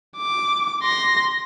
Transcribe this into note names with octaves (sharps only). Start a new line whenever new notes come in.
D6
C6 A#6